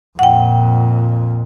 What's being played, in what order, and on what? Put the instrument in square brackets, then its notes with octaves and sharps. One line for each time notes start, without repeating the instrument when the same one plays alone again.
[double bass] F2 A#2 [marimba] F#5 G5